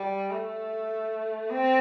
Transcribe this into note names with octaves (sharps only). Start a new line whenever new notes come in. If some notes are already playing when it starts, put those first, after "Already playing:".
Already playing: G3
A3
C4